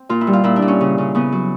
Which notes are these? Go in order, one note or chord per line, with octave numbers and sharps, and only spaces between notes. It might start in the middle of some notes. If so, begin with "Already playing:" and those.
Already playing: C4
A#2 F4
E4
G3
F4
A#2 E4
D4
A#2
C#4
C#3
C#3
C#3 B3
F#3